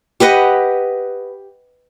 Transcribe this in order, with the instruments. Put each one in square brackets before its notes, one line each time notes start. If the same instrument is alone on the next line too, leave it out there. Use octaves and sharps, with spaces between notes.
[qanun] G4 B4 D#5 F#5